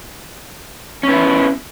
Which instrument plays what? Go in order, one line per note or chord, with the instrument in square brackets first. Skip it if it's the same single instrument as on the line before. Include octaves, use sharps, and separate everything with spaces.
[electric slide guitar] C#4
B3
E4